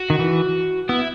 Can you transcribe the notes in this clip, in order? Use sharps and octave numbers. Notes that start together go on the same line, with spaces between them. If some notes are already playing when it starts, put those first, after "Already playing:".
Already playing: F#4
D#3
E3
B3 E4